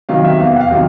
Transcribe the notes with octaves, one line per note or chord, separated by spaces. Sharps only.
C3 D#3 F#3 F5
E5
E2 F5
F#5
F5
C3 D#3 F#3